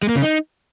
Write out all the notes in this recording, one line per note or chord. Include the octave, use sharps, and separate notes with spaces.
G#3
A#3
C#3
D#4